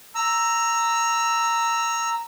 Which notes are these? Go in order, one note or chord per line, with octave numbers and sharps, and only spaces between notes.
A#5 E6